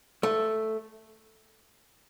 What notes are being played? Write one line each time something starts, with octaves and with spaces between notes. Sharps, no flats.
A3